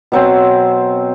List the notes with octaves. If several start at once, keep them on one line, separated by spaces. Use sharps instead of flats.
B2 F#3 C4